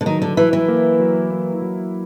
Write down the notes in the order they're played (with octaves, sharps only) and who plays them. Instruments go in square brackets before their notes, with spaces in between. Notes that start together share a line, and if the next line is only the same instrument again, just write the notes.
[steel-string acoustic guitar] D3
[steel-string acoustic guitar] D#3 [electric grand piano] F#3
[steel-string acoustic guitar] D3
[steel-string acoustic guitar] E3 [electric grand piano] E4
[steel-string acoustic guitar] E3
[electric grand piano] A#3
F#3
A#3
F#3